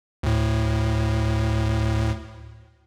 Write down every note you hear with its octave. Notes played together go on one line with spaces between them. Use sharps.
D2 A2